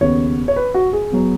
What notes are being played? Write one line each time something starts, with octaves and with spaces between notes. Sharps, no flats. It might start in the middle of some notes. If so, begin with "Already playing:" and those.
D#2 C#3 B3 C#5
C#5
B4
F#4
G#4
F#3 B3